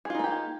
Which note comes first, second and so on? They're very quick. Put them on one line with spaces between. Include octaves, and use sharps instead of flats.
G#4 F4 D#4 A#3 G4